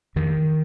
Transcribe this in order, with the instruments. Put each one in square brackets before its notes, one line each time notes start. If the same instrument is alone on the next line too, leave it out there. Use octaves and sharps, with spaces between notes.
[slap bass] F2 D#3